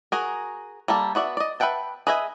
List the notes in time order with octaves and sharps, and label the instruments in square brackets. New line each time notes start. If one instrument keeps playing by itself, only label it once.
[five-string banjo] F#4 G#4 A#4
G3 A#3 A4
B3 F#4 D5 E5
D5 D#5
B4 E5 F#5 G5 A5
G#4 B4 D#5 E5 G#5